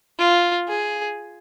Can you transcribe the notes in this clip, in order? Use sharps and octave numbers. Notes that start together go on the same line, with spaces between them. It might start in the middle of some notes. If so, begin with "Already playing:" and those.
F4
G#4